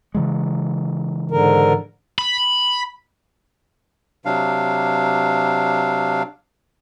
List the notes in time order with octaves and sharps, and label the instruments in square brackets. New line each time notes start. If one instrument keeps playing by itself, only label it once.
[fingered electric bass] C#3 E3 G#3
[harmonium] G#2 D3 A#4
[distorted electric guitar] B5
[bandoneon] C3 F#3 D4 F5